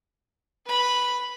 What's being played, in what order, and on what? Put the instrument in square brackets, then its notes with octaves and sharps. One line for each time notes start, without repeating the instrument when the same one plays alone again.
[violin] B4 B5